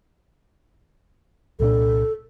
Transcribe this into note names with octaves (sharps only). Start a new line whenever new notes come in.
C2 A#2 D4 A4